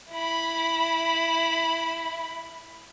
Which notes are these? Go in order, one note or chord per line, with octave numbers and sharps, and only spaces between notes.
E4 B5